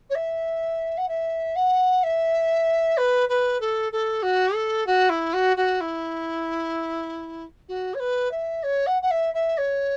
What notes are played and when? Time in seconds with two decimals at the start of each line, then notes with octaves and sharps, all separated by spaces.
0.10 C#5
0.15 E5
0.97 F#5
1.08 E5
1.55 F#5
2.03 E5
2.97 B4
3.29 B4
3.60 A4
3.92 A4
4.22 F#4
4.54 A4
4.86 F#4
5.09 E4
5.33 F#4
5.56 F#4
5.80 E4
7.68 F#4
7.94 C#5
7.99 B4
8.31 E5
8.63 C#5
8.86 F#5
9.02 F#5
9.10 E5
9.34 E5
9.57 C#5